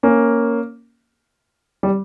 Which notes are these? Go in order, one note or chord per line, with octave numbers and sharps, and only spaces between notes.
A#3 C#4
G3